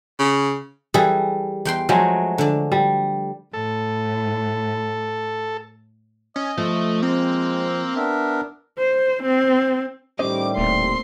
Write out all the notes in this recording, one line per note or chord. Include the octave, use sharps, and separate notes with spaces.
C#3
E3 G3 G#4 A4
E2 G5 C6
F3 F#3 G#3 A3
D3 D4
G3
A2 A4
C#4 D#5
F3 A3
G#3 A#3 C4
B3 D4 A#4 E5
C5
C4
A2 D#3 G3 C#4 C5 D#5 D6
D#1 A3 A#3 C4 C6